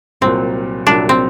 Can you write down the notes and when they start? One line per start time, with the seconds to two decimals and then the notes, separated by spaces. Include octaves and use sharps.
0.21 C2 A#2 F#3 C4
0.87 C2 A#2 F#3 D4
1.09 C4